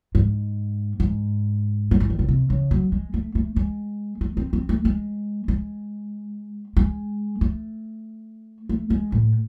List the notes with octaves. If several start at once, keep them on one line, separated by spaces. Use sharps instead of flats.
G#2
G#2
F#3
E3
D#3
C#3
C3
C#3
F#3
G#3
A3
A3
G#3
A3
C4
C4
A3
G#3
G#3
G#3
A3
A3
G#3
A2